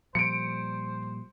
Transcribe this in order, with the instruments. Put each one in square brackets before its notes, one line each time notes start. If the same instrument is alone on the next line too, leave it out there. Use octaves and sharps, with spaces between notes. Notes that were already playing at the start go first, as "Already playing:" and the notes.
[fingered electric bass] A#2 F3 G3 [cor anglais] C5 [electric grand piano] C#7 D7